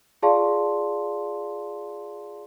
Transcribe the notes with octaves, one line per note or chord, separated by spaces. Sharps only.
F4 G#4 D5 F5 A5 C6